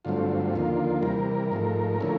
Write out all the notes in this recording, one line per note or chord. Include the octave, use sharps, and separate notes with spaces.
G2 D3 F#3 A3 C4 F4
D#2 D3 F3 A#3
C3 E3 G3 A#4
G#2 F3 A3
D3 F3 A3 C#4 E4